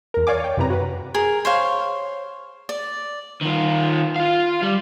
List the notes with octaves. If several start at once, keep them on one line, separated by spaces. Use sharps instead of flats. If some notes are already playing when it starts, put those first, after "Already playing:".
E2 A#4
C#5 D5 F5 G#5 D6
C#5 G5
F#2 C3 C4 E4 B4 A#5
F#4 B4
G#4 A#4
C5 C#5 F5
D5
D#3 F4
F4 F5
G3